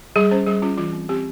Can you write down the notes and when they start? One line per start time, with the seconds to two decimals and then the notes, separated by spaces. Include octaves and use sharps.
0.16 G3 G#4
0.31 C#4 C5
0.47 G3 G#4
0.62 C#4 F4
0.77 E3 F4
0.93 C4
1.09 C4 G4